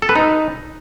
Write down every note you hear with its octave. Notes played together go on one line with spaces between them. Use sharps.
A4
B4
D#4